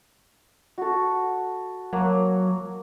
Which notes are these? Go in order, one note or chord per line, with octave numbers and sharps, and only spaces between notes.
F#4 A4
F#3 A#3